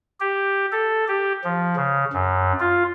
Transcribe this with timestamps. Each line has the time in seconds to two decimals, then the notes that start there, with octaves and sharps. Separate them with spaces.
0.20 G4
0.72 A4
1.08 G4
1.44 F3
1.76 C#3
2.13 F#2
2.60 F4